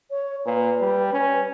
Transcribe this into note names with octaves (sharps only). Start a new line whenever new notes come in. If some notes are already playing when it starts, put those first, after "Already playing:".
C#5
A#2 B4
G3
C#4